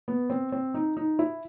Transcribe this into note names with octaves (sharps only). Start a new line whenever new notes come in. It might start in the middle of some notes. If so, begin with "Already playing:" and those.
B3
C4
C4
D#4
D#4
E4